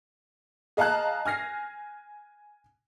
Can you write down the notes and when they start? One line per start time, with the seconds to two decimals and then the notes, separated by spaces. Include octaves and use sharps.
0.77 G#4 D#5 F5 A5 A#5 F#6
1.25 G#5 F6 A#6 C7